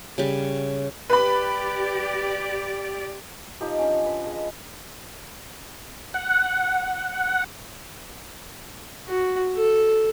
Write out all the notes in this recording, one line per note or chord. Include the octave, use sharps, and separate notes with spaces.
C#3 G3
G4 B4 D5 B5
F3 D#4 G4 D#6
C#4 D4
B4
G#4 D#5
F#5
F#4
A4